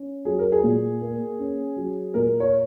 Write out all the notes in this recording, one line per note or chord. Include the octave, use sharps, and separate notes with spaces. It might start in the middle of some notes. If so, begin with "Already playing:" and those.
Already playing: C#4
F#3 G#4
A#4
G#4
A#2
A#3
C#4
F#3
A#2 A#4
C#5